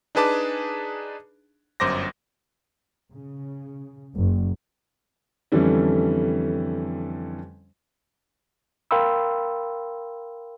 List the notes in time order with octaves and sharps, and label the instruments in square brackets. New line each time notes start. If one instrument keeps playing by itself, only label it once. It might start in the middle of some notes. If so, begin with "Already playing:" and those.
[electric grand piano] D4 D#4 G#4 B4 A5 D6
G1 F#2 C5 D6 A#6
[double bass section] C#3
F#1
[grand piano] F2 D3 E3 G3 A3 C#4
[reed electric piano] A#4 F5 G5 B5 C6 E6